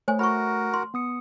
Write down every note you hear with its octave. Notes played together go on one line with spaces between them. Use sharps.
A3 C5 C#5 G#5
F#4 A#4 B5 C#6
C6
B3 D#6 C#7